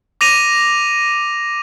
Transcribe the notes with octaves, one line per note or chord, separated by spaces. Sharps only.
D6 A#6 D#7 F7